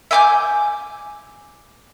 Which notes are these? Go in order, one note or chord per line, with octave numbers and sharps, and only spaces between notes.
E5 G#5 D6 G6